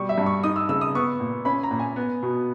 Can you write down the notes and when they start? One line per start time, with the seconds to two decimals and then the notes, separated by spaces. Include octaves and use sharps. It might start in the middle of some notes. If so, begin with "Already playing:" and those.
Already playing: B2 G3 C#6
0.09 E5
0.18 G2
0.26 C#6
0.43 D#4 D#6
0.56 E6
0.69 C#3 E6
0.81 D#6
0.95 B3 C#6
1.20 A#2
1.45 C#4 B5
1.63 A#5
1.71 A#2
1.79 G#5
1.96 B3
2.23 B2